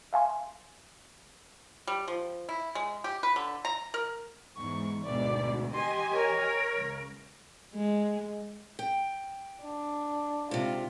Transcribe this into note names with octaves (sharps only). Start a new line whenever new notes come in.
E5 F5 G#5 C6
G3
F3
E4
G#3
G4
B4
D3
A#5
A#4
E2 G#2 C#6
D2 G#2 B2 D5
G4 D#5 G#5 C6
A#4 C#5
C#2
G#3
G5
D4
G#2 C3 F4